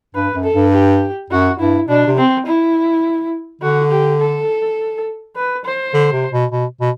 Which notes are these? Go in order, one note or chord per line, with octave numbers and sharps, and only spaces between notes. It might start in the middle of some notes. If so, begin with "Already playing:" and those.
G2 B4
F#2
A4
G2
G4
F#2 F#4
G2 E4
B2 D4
C3
C4
E4
D3 F#4
G4
A4
B4
C5
D3
C3
B2
B2
B2